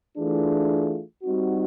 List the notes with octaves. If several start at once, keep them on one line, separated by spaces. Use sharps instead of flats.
E3 A3 D4 F4 G#4
G3 C4 D#4 F#4